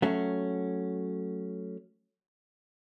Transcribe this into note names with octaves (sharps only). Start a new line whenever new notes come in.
F#3 A3 C#4